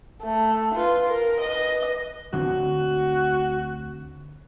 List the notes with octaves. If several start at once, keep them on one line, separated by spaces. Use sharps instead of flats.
A3
F4 B4
A#4
B4 D#5
D2 D3 C4 F#4